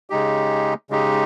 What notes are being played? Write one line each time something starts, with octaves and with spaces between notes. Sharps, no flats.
C#3 G#3 D#4 G4
C#3 G#3 D#4 G4